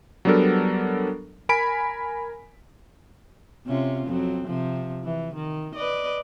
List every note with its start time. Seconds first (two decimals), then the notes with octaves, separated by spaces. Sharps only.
0.25 F#3 G3 B3 D4 A4 A#4
1.49 A#4 G#5 B5 B6 D7
3.66 C3 C#4 F4
4.07 F2 F#3 C4
4.47 C3 F3
5.04 E3
5.35 D#3
5.75 B4 D5 D#5